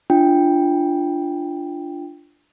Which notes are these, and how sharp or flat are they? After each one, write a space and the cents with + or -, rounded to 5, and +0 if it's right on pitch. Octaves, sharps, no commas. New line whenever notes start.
D4 +0 F4 -20 G5 +5